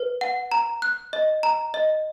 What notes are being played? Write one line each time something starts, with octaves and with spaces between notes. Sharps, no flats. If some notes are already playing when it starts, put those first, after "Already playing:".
Already playing: B4
F#5
A#5
F#6
D#5
A#5
D#5